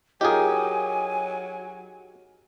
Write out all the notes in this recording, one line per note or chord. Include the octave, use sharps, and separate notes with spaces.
F#3 D#4 F4 G4 G#4 A#4 G#5